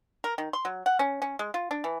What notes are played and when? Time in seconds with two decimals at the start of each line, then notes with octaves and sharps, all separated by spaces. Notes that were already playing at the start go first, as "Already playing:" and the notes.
0.24 A#4
0.38 D#3
0.53 C6
0.65 F#3
0.86 F#5
0.99 C#4
1.22 C#4
1.39 G#3
1.54 F4
1.71 D4
1.84 E3